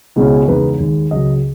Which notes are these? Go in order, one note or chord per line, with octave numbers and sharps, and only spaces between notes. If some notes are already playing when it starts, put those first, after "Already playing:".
C#2 B2 G#3 C#4 E4
E2 C#3 G#3 B3 D#4 B4
D#2 D#3 G#3
C#2 C#3 F#3 D#5